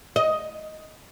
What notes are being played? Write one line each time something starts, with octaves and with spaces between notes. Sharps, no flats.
D#5